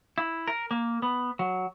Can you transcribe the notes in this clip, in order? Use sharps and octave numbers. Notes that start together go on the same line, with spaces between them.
E4
A#4
A#3
B3
F#3